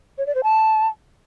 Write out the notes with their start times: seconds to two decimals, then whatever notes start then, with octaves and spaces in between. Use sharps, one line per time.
0.18 C#5
0.27 D5
0.35 C5
0.44 A5